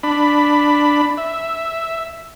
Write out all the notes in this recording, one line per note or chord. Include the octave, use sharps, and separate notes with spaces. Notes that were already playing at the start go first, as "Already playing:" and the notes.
D4 B5
E5